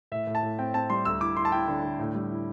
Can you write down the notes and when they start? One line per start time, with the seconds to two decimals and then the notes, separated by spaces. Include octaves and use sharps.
0.12 A2 E5
0.27 A2
0.35 A5
0.43 A2
0.59 C4 G5
0.74 C4 A5
0.90 G3 C6
1.05 D2 E6
1.21 E4 D6
1.37 E4 C6
1.45 A5
1.52 E4 G5
1.68 D3
1.83 D3
1.99 A2
2.15 G3
2.31 E4